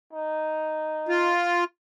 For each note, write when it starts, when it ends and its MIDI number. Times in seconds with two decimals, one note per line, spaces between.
0.13 1.32 63
1.09 1.64 65